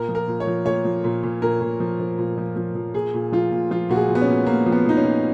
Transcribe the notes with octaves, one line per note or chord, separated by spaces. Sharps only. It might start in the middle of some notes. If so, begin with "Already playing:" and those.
Already playing: A#2 A#4
F3
A#4
A#2
C#5
F3
A#2 C#5
F3
A#2
A#2
A#2 A#4
A#2
F3
F3
A#2
F3
F3
F3
A#2 G#4
A#2
F3 F4
A#2
F3 F4
A#2 F#4
G#4
F3
B3
C#4
A#2
A#2 A#3
F3
B3
F3 D#4
C#4
A#2